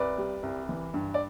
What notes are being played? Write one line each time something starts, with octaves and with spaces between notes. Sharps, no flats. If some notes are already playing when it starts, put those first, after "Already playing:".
Already playing: C2 B4 D5
G3
C2
E3
G2
D5